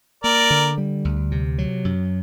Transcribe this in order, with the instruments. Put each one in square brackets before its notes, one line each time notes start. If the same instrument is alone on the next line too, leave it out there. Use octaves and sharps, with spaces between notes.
[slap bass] A#3 [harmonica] A#4 D5
[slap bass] D3
G3
D2
C3
F#3
F#2